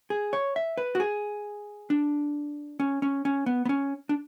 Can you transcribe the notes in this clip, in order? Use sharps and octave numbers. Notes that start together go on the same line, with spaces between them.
G#4
C#5
E5
B4
F#4
G#4
D4
C#4
C#4
C#4
B3
B3
C#4
D4